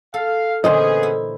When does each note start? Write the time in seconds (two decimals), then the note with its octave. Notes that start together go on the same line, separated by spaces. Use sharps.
0.14 A4 F5
0.64 A#2 D3 E3 B3 C#4 G#4 C5 D#5
1.03 E4